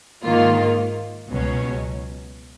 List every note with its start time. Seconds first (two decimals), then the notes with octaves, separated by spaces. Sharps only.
0.23 G#2 D#3 A#3 F4
1.30 C#2 B2 F#3 C#4